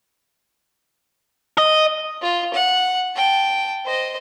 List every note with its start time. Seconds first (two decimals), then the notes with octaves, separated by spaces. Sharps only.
1.58 D#5
2.21 F4
2.54 F#5
3.16 G5 A5
3.85 C5 D#5